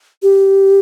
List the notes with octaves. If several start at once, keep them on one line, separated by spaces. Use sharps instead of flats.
G4